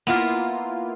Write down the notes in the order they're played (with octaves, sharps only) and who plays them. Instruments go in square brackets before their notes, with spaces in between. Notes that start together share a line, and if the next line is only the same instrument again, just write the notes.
[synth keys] A#3 E4 F4 [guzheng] B3 A#4